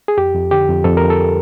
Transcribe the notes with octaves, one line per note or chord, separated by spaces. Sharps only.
G#4
F2 G4
F2
D3 G4
F2
F2 A4
F2 A#4
A4